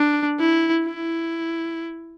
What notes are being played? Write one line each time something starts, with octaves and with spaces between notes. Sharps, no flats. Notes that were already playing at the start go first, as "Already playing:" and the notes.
Already playing: D4
E4
E4